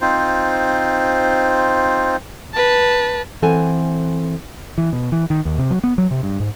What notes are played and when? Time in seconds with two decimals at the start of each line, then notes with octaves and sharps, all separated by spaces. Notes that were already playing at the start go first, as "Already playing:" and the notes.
0.01 C4 D#4 F4 C5
2.54 B4 A5
3.42 E3 C4 A4 F#5 G#5
4.78 E3
4.92 B2
5.12 E3
5.30 D#3
5.45 D#2
5.58 C3
5.71 F#3
5.84 B3
5.98 F#3
6.11 C3
6.23 G2
6.40 G#2